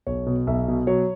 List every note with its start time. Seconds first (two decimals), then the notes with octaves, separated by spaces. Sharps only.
0.07 B1 C#5
0.26 B2
0.47 B1 E5
0.68 B2
0.87 F#3 C#5